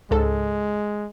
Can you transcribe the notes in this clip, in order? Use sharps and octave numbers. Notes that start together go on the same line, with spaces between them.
C#2 G#2 G#3 A4